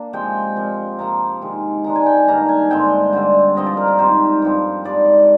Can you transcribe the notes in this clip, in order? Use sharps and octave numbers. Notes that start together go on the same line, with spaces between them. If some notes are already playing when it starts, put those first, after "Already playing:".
Already playing: A#3 D4
C3 F3 G#3 G5
A#2 F3 C4
C3 F3 A#3 A#5
C3 D#3 G#3
D#3 G#3 D4 A#5
G#5
G5
G#5
G2 D#3 A#3 D4 A#5
G#5
G2 D3 G#3 C4 G5
D3 G3 C4
G2 F3 C4 D#5
D5
A#4
A#4
G#2 D#3 G3 C4 C5
G2 F3 C4
G#2 G3 D4 D5
D5